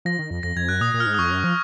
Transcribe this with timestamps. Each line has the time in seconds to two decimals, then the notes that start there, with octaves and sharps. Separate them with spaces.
0.05 F3 A#6
0.19 D#3
0.31 F2
0.43 F2 A#6
0.56 F2 G#6
0.69 F#2 F#6
0.81 A#2 D#6
0.94 A#2
1.00 F6
1.06 G#2
1.14 D#6
1.18 F2 C#6
1.32 F#2
1.44 F3